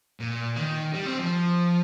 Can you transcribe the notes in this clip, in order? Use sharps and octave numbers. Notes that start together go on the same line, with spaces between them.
A#2
D#3
G3
C4
F3